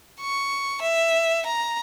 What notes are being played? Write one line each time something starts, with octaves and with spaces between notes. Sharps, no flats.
C#6
E5
A#5